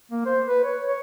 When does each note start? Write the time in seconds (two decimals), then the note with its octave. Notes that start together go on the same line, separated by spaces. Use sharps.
0.11 A#3
0.26 C5
0.48 B4
0.64 C#5
0.87 C#5